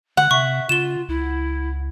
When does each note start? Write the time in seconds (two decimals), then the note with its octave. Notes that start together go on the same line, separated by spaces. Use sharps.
0.17 D3 F#5
0.31 C3 E5 C#6
0.69 C#3 F4 E7 G7
1.09 C#2 E4